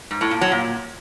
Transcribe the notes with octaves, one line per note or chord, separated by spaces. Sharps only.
G#2
A2
A#2
F#3
A#2